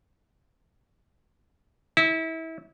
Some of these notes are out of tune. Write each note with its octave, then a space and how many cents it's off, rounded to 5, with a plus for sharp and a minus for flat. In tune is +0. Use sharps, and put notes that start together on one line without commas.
E4 -30